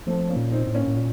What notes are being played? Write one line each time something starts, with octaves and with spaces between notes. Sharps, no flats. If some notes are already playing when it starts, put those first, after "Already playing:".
F3 A3 C4
A#3 C#4
A#2
C4 D#4
A2
A#3 C#4
A2
A#2